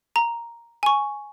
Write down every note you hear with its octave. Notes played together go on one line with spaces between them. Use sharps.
A#5
G#5 C#6